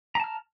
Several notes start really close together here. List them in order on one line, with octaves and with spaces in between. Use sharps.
A#5 A5 F6